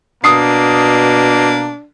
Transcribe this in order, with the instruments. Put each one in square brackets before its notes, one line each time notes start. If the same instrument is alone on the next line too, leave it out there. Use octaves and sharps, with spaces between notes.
[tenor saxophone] B2 [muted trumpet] A#3 [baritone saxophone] D4 [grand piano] D#6 C7